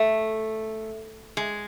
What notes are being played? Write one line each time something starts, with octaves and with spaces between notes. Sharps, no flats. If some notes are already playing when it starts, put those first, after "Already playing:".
Already playing: A3
G#3